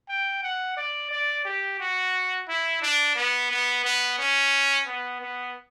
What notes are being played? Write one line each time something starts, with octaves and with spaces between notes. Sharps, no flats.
G5
F#5
D5
D5
G4
F#4
E4
D4
B3
B3
B3
C#4
B3
B3